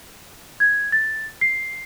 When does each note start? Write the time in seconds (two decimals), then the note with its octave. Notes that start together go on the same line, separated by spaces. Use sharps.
0.60 G#6
0.92 A6
1.41 C7